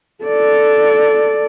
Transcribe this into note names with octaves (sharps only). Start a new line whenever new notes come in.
A4 D5